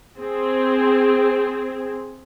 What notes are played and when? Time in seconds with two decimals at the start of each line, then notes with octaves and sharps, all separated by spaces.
0.19 C4 G#4